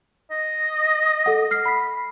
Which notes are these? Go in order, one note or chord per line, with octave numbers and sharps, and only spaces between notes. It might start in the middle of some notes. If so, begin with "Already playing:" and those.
D#5
A4 F#5
F6 C7
B5 B6